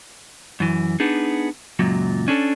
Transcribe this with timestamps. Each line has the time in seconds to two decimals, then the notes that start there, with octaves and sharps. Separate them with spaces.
0.60 F#2 E3
1.00 B3 D4 D#4 G#4
1.79 C#2 F#2 A#2 F#3
2.28 C#4 D4 A4